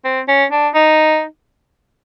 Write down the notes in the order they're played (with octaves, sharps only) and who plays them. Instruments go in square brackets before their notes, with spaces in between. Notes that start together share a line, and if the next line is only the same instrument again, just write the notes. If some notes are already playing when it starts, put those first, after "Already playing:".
[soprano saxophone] C4
C#4
D4
D#4